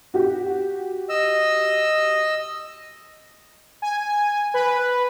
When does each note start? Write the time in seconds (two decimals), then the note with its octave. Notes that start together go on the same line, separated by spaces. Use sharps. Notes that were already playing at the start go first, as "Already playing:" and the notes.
0.14 F#4 G4
1.09 D#5 E6
3.82 G#5
4.54 B4